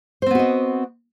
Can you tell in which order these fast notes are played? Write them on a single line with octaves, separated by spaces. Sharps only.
C5 C4 B3 F#4 D#5